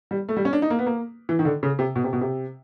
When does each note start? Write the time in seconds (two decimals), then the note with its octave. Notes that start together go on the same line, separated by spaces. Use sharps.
0.11 G3
0.29 A3
0.37 G3
0.45 C#4
0.53 D4
0.62 D#4
0.70 A#3
0.79 B3
0.86 A#3
1.29 E3
1.39 D#3
1.45 D3
1.63 C#3
1.79 C3
1.96 B2
2.04 C3
2.13 B2
2.21 C3